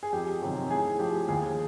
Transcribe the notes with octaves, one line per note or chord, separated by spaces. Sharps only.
G#4
F2 G4
C3 D#3 F#3
A2 G#4
F3 G4
D#2 G#4